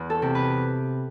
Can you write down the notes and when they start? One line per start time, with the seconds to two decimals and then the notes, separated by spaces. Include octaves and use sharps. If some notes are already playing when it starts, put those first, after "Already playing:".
Already playing: E2
0.10 A4
0.22 C3
0.35 B4